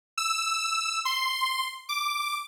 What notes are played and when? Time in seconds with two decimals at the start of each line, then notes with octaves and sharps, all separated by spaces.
0.18 E6
1.05 C6
1.89 D6